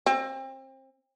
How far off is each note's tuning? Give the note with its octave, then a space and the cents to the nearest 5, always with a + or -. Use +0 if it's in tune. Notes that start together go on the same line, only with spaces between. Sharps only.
C4 +30